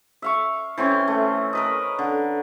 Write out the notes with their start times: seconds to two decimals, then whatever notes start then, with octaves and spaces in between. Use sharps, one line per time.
0.22 E5 F5 C#6
0.78 E3 C4 C#4 C6
1.08 A3
1.53 A#4 B4 D#5
1.99 D3